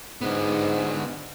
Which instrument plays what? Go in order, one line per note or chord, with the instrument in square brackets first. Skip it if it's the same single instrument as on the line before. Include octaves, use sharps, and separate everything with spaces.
[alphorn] G#2 [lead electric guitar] D3 B3